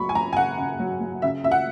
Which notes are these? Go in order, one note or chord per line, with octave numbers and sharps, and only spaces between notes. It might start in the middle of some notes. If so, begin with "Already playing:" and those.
Already playing: C#3 F#3 B5 C#6
G#5
F#3 A#5
G#5
C#3 F#5
C#3
F#3
F#3
C#3 E5
C#3 E5
F#5